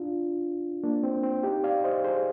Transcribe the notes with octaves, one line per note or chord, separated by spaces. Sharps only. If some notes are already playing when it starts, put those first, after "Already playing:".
Already playing: D4 F4
A#3 D4
C4
C4
D#4 G4
D5 F5
C5 D#5
G#4 C5